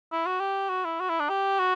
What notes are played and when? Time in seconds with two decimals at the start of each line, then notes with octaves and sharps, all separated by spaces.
0.12 E4
0.26 F#4
0.40 G4
0.69 F#4
0.85 E4
1.00 F#4
1.10 E4
1.20 D4
1.29 G4
1.59 F#4